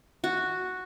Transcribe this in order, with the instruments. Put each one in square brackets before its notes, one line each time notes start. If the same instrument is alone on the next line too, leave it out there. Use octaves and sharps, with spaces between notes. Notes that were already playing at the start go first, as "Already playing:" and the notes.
[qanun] F#4